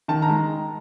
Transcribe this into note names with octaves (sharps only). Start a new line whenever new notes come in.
D#3 A5
A#5
G#3